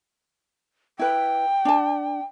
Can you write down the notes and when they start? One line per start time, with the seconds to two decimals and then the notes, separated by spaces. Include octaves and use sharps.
0.99 E4 B4 G5
1.65 D4 A5